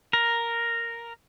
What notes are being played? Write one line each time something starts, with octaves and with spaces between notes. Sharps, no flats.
A#4